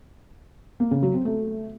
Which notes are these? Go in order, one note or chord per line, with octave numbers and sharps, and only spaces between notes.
A#3
C#3
F#3
C4
A3